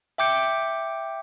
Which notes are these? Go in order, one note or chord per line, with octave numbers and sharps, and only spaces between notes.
E5 G5 D6 G6 C#7